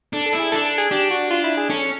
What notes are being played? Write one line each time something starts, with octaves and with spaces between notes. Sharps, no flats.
D4 A4
A4
E4
G#4
D4 A4
A4
G#4
D4 G4
F#4
F4
E4
G#4
C#4 A4